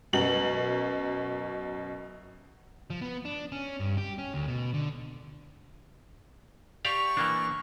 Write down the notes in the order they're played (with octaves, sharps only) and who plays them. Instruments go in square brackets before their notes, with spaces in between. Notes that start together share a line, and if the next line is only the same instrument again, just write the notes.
[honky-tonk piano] F#2 B2 F#7
[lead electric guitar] F3
B3
D4
C#4
G2
G4
C#4
D2
B2
D3
[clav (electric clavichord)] G4 D5 F5 [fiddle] C#6
[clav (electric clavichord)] E3 A#3 D4